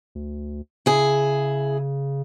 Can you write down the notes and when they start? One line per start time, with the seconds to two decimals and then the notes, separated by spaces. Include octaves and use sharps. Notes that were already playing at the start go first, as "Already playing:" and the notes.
0.15 D2
0.86 C#3 E4 G#4